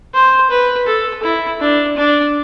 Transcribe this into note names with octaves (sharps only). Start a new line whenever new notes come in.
C5
B4
A4
E4
D4
D4